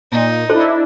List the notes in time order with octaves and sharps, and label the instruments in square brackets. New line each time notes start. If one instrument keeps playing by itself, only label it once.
[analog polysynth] A#2 [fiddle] D#4
[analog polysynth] D4 E4 [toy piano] A4 C5